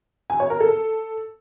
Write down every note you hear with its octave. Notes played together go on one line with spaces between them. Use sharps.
G#5
C#5
A#4
A4